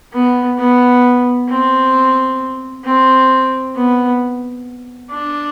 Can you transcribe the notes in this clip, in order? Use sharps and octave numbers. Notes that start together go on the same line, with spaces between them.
B3
B3
C4
C4
B3
D4